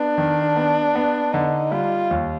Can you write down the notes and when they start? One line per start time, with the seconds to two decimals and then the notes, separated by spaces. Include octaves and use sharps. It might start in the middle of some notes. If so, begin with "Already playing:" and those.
Already playing: B3 D4
0.18 D#3
0.56 B3
0.95 B3
1.34 D3 D#4
1.72 G3 F4
2.11 D#2